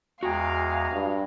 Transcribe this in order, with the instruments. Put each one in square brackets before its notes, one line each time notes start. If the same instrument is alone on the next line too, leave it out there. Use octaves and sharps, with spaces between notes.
[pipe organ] E2 G#3 A#5 [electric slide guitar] F#4 G5 [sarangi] F5
[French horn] G2